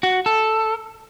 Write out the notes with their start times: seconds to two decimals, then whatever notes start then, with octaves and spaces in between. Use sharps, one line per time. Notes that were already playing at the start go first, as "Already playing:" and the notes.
0.03 F#4
0.26 A4